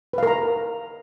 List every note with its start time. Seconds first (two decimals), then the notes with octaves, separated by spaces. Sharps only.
0.13 B4
0.18 F5
0.23 A#4
0.27 A#5